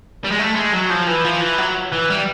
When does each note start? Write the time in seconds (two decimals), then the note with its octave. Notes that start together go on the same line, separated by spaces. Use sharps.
0.24 G3
0.31 G#3
0.39 A3
0.55 G#3
0.73 F#3
0.90 F3
1.07 E3
1.24 F3
1.41 E3
1.58 F#3
1.92 E3
2.10 G3